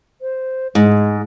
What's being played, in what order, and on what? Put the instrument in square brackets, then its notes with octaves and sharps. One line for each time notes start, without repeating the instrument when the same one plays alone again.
[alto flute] C5
[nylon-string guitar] G#2 [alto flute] G#3